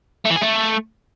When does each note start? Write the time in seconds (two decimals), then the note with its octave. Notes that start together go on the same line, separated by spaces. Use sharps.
0.25 A3
0.30 E3
0.36 G#4
0.41 A3